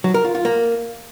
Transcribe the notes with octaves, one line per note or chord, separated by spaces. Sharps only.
F#3
A#4
F4
F4
A#3